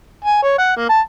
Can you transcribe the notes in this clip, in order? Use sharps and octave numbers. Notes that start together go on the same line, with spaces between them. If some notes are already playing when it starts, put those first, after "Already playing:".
G#5
C#5
F#5
A#3
A5